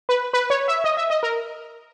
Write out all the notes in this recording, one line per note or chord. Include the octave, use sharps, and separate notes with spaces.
B4
B4
C#5
E5
D#5
E5
D#5
A#4